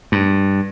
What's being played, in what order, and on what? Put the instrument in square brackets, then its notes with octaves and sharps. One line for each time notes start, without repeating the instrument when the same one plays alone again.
[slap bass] G2